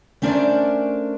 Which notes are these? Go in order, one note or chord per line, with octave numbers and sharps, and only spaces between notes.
A3 C#4 D4 A#4 C5 D5